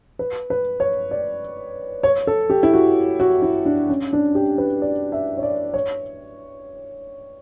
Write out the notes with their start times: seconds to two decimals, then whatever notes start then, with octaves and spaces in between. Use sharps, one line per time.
0.19 B4
0.50 B4
0.80 C#5
1.11 D5
2.03 C#5
2.27 A4
2.50 G4
2.63 E4
2.73 F#4
3.20 F#4
3.42 E4
3.65 D4
3.90 C#4
4.13 D4
4.35 G4
4.58 B4
4.82 D5
5.12 E5
5.38 C#5
5.43 D5
5.74 C#5